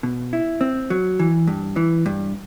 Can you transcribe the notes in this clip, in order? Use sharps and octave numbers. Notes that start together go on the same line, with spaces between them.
B2
E4
C4
F#3
E3
G2
E3
G2